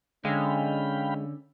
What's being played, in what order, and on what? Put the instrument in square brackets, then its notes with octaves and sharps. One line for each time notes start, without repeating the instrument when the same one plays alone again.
[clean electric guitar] D3 [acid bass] G#3 [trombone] C#4 [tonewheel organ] F5 G5 B5